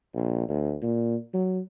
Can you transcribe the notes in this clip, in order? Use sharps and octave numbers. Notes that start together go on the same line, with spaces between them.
A#1
D2
A#2
F#3